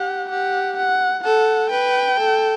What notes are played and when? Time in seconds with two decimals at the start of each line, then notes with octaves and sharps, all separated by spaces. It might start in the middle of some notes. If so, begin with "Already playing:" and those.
Already playing: G4 F#5
0.30 G4 F#5
0.77 F#5
1.24 A4 F#5
1.71 B4 G5
2.18 A4